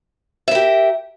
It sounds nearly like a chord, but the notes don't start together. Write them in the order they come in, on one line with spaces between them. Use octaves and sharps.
E5 A#4 G4